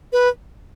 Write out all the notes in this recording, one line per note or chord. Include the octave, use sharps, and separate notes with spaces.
B4